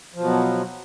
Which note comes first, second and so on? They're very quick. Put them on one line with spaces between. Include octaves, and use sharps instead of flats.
F3 B2 F#3